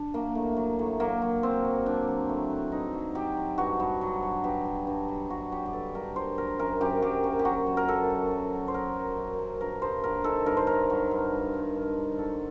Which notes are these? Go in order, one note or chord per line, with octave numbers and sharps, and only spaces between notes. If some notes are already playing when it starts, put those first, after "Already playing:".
Already playing: D4
F#3 A#3
A2
F#3
A2
F#3 A#3
F#3
F#3 C4
F#3
F#3 D4
F#3
A2
A2
G2 D#4
F#3
F#3 G4
F#3
G2 F#4
G2
F#3
F#3
G2 G4
F#3
G2
F#3
G2 F#4
F#3 G4
G4
G2 A4
G2 A#4
F#3 C5
F#3 A#4
F#2 A#4
F#2 G4
F#3 G4
F#2
G4
F#3 F#4
F#3
A#4
F#2 A4
F#3
F#3
F#3
C5
F#3 A#4
F#3
F#2
F#3
G2 A#4
G2 C5
F#3 A#4
D#3 A4
G2 A#4
C5
D#3 A#4
F#3
G2
G2
D#3
G2
G2
F#3 A4